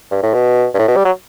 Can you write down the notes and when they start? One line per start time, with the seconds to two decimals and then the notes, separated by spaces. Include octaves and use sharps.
0.11 G2
0.23 A2
0.34 B2
0.74 G2
0.79 A2
0.88 B2
0.96 G3
1.05 F#3